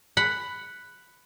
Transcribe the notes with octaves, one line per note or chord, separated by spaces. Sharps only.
F#5 B5